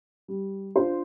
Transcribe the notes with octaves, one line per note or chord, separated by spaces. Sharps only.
G3
D4 F4 C5